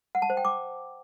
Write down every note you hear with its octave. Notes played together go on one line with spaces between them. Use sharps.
F#5
A5
C5
G5
D6